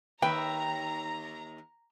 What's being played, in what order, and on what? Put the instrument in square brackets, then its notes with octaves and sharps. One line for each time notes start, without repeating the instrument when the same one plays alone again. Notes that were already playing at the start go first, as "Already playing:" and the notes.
[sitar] D#2 E5 [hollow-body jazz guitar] B4 [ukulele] G5 [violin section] A#5